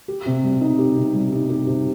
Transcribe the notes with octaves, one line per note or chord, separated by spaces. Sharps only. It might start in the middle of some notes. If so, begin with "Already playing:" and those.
G4
C3
G3
D#4
G4
C3
G3
D#4
G4
C3